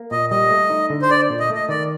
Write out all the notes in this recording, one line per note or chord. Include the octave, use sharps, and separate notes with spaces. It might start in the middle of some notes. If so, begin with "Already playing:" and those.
Already playing: A#3
A#2 D#5
G3 D#5
A3
D#4
D3
C5
D4 D5
A#2
D#5
A3 D#5
D#3 D5